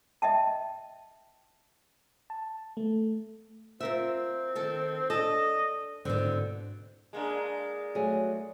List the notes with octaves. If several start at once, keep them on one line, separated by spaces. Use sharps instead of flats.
D#5 E5 G5 A5
A5
A3
C4 F4 A#4 E5
D#3 A4
D4 A4 D#5
G#2 B2 D3 C4 E4
G#3 A#3 D4
F#3 A3 G#4